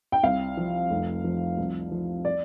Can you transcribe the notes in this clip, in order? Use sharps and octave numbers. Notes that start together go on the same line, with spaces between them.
G5
C2 F5
F3
F1
F3
C2
F3
D5